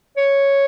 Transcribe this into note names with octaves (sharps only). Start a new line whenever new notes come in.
C#5